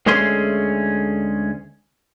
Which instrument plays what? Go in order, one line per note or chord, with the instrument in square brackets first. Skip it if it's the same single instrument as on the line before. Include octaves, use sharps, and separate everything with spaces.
[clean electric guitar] D2 G#3 A3 C#4 G#4 C6